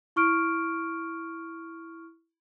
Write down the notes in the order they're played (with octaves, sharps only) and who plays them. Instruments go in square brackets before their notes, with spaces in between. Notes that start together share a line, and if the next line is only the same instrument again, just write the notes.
[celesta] E4 C#6 F6 D7